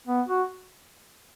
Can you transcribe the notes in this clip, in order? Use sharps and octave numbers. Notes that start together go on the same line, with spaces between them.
B3
F#4